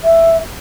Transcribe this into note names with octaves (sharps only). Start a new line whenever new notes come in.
E5